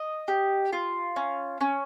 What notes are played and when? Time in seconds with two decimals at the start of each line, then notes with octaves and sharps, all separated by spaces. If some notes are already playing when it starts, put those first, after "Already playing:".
Already playing: D#5
0.28 G4
0.73 F4
1.16 C#4
1.61 C#4